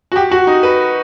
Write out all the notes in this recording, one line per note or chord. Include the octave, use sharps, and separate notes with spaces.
F#4
G4
F#4
D#4
B4